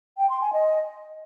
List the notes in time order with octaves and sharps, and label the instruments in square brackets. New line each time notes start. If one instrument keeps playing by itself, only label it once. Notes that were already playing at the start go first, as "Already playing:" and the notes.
[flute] G5
C6
G#5
D#5